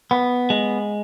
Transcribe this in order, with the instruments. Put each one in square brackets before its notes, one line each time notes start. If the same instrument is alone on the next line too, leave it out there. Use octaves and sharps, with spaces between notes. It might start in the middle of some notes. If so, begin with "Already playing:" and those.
[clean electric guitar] B3
G#3